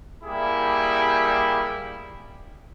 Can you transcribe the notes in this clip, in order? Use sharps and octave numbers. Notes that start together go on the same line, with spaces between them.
G3 A#3 E4 G4 G#4